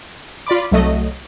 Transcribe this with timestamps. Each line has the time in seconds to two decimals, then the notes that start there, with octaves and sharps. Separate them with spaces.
0.47 F4 D5 B5 D6
0.71 C2 F#3 A3 D#5